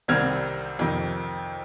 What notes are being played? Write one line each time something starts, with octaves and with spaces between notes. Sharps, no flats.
C2 C3 D#3 G3 C4 F6 G#6
F2 C3 D#3